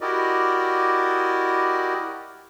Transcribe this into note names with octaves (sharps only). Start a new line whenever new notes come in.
E4 F#4 G4 A#4 D5 D#5